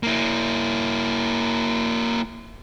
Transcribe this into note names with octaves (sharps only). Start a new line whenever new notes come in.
A#3 E4